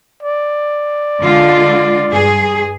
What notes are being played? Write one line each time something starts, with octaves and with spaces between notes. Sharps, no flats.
D5
D3 G#3 F4
G2 G#4